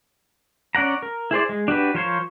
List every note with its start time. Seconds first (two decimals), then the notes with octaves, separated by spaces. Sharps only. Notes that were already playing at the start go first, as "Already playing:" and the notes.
0.75 C#4 D5 F#5 A#5
1.02 A#4
1.31 E4 G#4 C5 D5
1.49 G#3
1.68 D4 F#4 G4 B4
1.95 F3 A#4 C5 C#5 F5